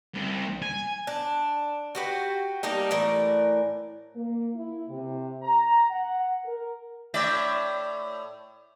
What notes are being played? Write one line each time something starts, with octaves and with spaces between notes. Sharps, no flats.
C2
G#5
D4
F#4 G4 B4
G3 A#3 D4 D#4
A2 E3 A#4 D5
A#3
E4
C3
A#5
F#5
A#4
A2 D5 E5